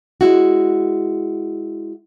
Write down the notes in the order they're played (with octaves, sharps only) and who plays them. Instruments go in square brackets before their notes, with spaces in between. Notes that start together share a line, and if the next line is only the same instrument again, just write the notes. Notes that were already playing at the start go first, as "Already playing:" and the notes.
[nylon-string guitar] G#3 E4 F#4